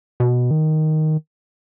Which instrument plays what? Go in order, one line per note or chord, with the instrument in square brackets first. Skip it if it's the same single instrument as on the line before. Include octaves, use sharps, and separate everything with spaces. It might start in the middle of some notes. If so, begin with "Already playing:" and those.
[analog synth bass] B2
D#3